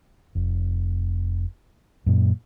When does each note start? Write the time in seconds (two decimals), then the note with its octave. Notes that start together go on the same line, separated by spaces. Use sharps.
0.35 F1
2.06 F#2 A#2